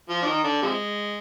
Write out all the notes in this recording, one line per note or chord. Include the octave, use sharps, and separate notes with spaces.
F3 F4
D4
D#3 D#4
D3 D4
C3 F3 G#3